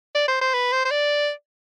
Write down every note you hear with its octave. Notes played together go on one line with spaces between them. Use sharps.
D5
C5
C5
B4
C5
C5
D5